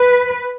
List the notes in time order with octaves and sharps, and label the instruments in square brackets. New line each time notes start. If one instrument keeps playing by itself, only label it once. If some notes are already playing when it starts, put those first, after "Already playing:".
Already playing: [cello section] B4